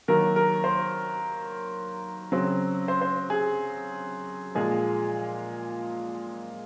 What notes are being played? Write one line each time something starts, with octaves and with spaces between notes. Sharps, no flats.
D#3 F#3 A#3 A#4
A#4
C5
C#3 F#3 C4
C5
C5
G#4
A#2 F3 G#3 G#4